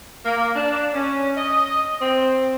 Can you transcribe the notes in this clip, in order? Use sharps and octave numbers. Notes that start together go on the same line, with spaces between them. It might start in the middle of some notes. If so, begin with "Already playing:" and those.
A#3
D4
C#4
D#5
C4